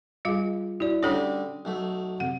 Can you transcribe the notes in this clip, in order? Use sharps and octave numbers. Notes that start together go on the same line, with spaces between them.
G3 F4 G#4 F5 D6
E4 F#4 D5
D3 G3 A3 C#4 A4 C#5 D#6
B1 A3
C3 F#5